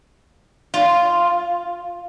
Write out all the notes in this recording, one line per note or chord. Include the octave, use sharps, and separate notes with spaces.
F4